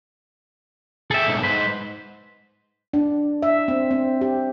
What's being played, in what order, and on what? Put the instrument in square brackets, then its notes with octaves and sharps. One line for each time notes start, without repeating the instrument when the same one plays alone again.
[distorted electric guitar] G#4 G5 [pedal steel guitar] A4 E5
[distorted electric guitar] B1 G#2
[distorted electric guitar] G#2 [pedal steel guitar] B4 C5
[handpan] D4
E5
C4
C4
G4